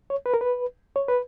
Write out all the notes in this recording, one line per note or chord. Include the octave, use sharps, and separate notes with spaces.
C#5
B4
A#4
B4
C#5
B4